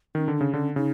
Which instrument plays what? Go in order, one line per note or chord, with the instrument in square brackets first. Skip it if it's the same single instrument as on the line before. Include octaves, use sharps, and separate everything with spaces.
[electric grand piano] D#3 [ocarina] C#4
[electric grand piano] D3
[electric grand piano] C#3 [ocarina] D4
[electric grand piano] D3 [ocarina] C#4
[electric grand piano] C#3 [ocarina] D#4